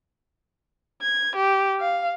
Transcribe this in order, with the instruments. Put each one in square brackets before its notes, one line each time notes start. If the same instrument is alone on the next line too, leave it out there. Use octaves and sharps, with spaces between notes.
[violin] G#6
G4
F5